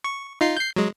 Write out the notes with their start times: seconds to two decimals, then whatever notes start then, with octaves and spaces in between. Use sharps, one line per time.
0.04 C#6
0.41 D#4 F4 C7
0.57 G6 C7
0.76 F#3 G#3